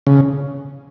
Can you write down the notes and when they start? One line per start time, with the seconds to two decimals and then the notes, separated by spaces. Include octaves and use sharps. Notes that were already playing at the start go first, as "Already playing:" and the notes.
0.07 C#3